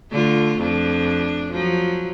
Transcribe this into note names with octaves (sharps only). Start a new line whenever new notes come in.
D3 A3 F4
F2 D4
F3 F#3